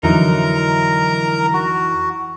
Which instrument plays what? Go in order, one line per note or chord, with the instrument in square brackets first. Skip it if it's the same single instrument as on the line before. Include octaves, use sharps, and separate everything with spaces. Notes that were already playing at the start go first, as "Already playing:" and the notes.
[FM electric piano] F2 E3 E4 [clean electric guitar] D3 F#3 D#4 [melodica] A#4 A#5
[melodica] F#4